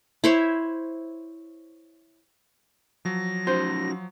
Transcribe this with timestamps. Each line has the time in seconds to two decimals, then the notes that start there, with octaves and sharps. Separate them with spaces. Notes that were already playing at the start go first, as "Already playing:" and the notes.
0.24 E4 C5 C#5 E5
3.05 F3 F#3 A#6
3.47 C#4 D#4 F#4 C5